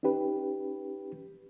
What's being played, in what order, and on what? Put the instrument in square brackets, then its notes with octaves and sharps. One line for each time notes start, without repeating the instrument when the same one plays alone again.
[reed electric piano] C#4 D#4 G4 B4